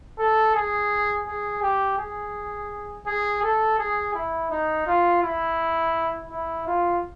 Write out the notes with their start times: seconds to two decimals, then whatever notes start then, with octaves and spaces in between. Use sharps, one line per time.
0.18 A4
0.55 G#4
1.27 G#4
1.62 G4
1.98 G#4
3.06 G#4
3.42 A4
3.78 G#4
4.15 E4
4.51 D#4
4.86 F4
5.23 E4
6.31 E4
6.67 F4